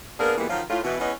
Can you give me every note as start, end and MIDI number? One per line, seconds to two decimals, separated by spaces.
0.20 0.36 58
0.20 0.36 59
0.20 0.36 62
0.20 0.36 68
0.20 0.36 70
0.38 0.48 46
0.38 0.48 52
0.38 0.48 55
0.38 0.48 56
0.38 0.48 58
0.38 0.48 59
0.50 0.62 51
0.50 0.62 53
0.50 0.62 54
0.50 0.62 65
0.70 0.79 45
0.70 0.79 65
0.84 0.97 47
0.84 0.97 52
0.84 0.97 59
1.00 1.11 40
1.00 1.11 52
1.00 1.11 59
1.00 1.11 61
1.00 1.11 75